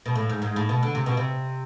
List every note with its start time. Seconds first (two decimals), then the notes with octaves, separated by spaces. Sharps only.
0.06 B2
0.15 A2
0.29 G#2
0.42 G#2
0.56 A2
0.69 B2
0.83 D3
0.95 C3
1.06 B2
1.17 C3